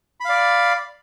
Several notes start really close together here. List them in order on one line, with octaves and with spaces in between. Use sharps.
B5 F5 D5